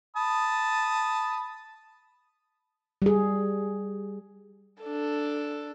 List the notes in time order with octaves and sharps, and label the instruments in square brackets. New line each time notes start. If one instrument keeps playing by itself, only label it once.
[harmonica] A5 B5 D#6
[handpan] G3 G#4
[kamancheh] D4 A4